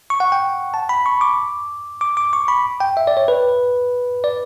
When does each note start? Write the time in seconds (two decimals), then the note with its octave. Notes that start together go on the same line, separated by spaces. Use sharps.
0.10 C#6
0.20 F#5
0.32 G5
0.74 A5
0.89 B5
1.06 C#6
1.21 D6
2.01 D6
2.17 D6
2.33 C#6
2.48 B5
2.80 G5
2.97 E5
3.07 D5
3.17 C#5
3.28 B4
4.24 D5